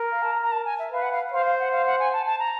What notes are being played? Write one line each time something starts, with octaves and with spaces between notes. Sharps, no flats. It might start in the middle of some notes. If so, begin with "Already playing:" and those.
Already playing: A#4
F5
A5
A#5
A#5
A5
G#5
E5
B4 F5
F#5
F5
C5 F5
F5
F#5
F5
F#5
G#5
A5
A5
A#5